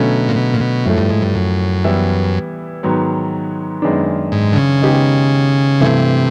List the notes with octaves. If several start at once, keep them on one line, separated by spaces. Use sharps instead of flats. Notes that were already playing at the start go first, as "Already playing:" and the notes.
Already playing: B2 D3 F#3 A3 C#4
A#2
B2
A#2
B2
F#2 A2 F3 A3
G2
G#2
G2
F#2
E3 G3 B3 E4
G#2 D#3 F#3 B3
F#2 D#3 G#3 B3 D4
G#2
D3
C#3
D#3 G#3 B3 D#4 G4
G2 C3 E3 A3